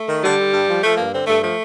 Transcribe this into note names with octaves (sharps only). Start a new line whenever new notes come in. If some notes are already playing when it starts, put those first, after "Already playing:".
Already playing: A3
D#3
D3 G3
D3
G2
F3
F3 A3
G2 A#3
D3 C4
G2 A3
F3 A3